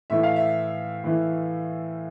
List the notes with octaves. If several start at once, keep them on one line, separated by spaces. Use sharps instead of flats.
A2 E3 A3 E5
F5
E5
A2 E3 A3